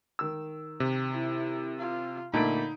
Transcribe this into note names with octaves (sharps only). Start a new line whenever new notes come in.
D#3 E6
C3
E4
F4
A#2 D3 A3 D#4 B5 D7